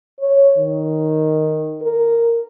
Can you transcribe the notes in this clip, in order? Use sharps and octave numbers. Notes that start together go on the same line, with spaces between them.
C#5
D#3
A#4